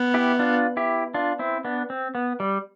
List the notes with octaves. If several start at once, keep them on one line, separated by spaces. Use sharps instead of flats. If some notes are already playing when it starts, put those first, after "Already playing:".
Already playing: B3
E4 G4
D4 F4
E4 G4
D4 F4
C4 E4
B3 D4
C4
B3
G3